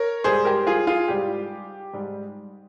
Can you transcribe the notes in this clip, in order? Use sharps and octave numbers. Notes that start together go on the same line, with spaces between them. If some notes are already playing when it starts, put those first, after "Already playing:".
Already playing: A#4 C#5
G#2 G3 G#4 C5
G4 A#4
F4 G#4
F4 G#4
G#2 G3 G4
G#2 G3